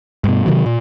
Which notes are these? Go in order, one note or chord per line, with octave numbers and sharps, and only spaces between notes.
G2 B2
C3 D#3 F#3
A#2